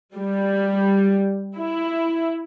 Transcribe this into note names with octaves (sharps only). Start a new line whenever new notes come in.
G3
E4